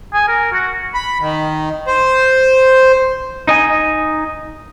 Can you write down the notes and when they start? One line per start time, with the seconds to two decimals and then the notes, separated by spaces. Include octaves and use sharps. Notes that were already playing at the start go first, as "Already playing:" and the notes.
0.14 G#5
0.28 A#4
0.52 F#4
0.94 B5
1.21 D#3
1.87 C5
3.47 D#4 D#5 G#5